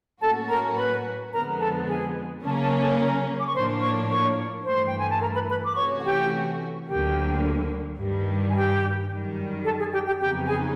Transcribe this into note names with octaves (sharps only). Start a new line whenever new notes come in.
A2 F#3 A#3 C#4 F#4 A4 A5
A#4 A#5
B4 B5
F2 D3 F3 G#3 B3 A#4 A#5
A4 A5
G#4 G#5
C#3 F#3 A#3 C#4 A5
A#5
A5
A#5
A4 A5
A#4 A#5
D6
C#6
A2 F3 A#3 D4 C5 C6
C#5 C#6
C#5 C#6
G2 E3 A3 C5 C6
G5
G#5
A5
A#4 A#5
B4 B5
B4 B5
D6
C3 E3 A3 C#4 F#4 C#5 C#6
F#5
G4 G5
D2 D3 F#3 A#3 G4 G5
G2 D#3 G3
G#5
G4 G5
F#2 D#3 G3
A4 A5
G#4 G#5
G4 G5
G4 G5
F2 C#3 F#3 B3 D#4 G4 G5
G#4 G#5